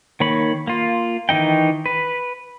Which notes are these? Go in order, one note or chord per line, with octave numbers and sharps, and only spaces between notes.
D#3 A#3 C#5 B5
A#3 F4
D#3 E3 D#4 G5
B4